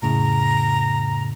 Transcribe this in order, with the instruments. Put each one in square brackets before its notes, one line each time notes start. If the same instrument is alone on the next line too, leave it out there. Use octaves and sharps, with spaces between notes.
[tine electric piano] F2 A2 C#3 [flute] A#5